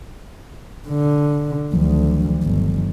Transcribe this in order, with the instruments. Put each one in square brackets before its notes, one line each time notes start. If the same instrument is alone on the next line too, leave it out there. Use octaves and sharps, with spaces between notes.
[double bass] D3
[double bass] D2 [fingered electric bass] D#3 F3 F#3
[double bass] G1